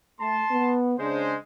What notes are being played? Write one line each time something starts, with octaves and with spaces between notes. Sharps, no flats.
A3 A5 C6
B3
C#3 G#3 D4 G#4 C5